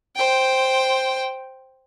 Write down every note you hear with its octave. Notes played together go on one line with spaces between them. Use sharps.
C5 G5